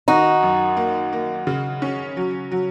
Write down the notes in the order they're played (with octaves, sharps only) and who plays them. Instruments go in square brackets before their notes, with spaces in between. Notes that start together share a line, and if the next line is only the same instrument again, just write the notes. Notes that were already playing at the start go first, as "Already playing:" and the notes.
[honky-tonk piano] D#3 [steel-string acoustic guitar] D#4 F#4
[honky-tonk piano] F#2
A#3
A#3
C#3
C#4
F#3
F#3